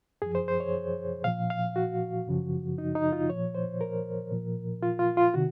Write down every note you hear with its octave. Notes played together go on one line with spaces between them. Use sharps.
F#2 F3 G#4
C5
C5
C#5
A#2 F3 F5
F5
F#4
F#2 C#3 F3
D#4
D#4
F4
A#2 F3 C#5
C5
A#4
A#2 F3
F4
F4
F4
C3 D#3 F#4